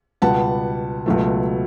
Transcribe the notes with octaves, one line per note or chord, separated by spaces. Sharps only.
C#2 B2 G3 B3 F#5 A5
C#2 B2 F#3 A3